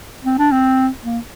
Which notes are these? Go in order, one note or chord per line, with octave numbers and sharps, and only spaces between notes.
C4
D4
C4
A#3